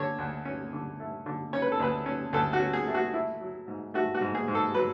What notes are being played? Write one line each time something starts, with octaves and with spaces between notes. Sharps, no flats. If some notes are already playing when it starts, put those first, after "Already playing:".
Already playing: D3 C#5
D2
C#4
D3
A3
D3
C#4 C#5
B4
A4
D2 B4
C#4
D2 A4
F#4
C#4
G#4
A3
F#4
A3 E4
F#3
G#2
A3 F#4
F#4
G#2
G#4
G#2
A4
F#3 B4